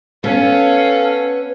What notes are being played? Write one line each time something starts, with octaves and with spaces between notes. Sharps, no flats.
B3 C#4 A4 F5